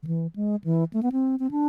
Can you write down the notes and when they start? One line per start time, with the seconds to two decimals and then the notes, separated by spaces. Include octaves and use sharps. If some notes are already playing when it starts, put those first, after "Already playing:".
0.03 D3
0.07 E3
0.36 G#3
0.64 E3
0.93 A3
1.03 B3
1.12 C4
1.39 C4
1.51 D4